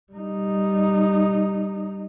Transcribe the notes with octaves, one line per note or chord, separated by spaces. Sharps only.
G3 D#4